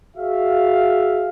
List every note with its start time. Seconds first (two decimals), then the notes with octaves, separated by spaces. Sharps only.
0.16 F#4 G#4 E5 F5